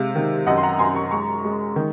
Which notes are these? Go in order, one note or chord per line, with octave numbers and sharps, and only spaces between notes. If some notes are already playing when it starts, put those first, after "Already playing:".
Already playing: C3 G#3 F5
D#3
F#2 D#5 F#5
C6
F#5 A#5
F#2 G#5 C6
A#5 C#6
G#3 A#5 C#6
G#3
D#3